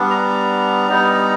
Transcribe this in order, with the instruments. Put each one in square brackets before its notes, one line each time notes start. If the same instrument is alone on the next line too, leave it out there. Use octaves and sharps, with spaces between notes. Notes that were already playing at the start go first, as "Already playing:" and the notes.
Already playing: [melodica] G3 B3 D4
A#5
G3 B3 D#4